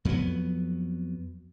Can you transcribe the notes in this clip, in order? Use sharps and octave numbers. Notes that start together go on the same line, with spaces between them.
F2 F#3 G3 B3